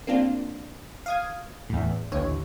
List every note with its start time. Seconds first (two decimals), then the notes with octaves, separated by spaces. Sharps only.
0.07 A#3 C4 D4 F4
1.06 F5 D#6 G#6
1.69 E2 A2
2.12 A1 D#2 D3 C#5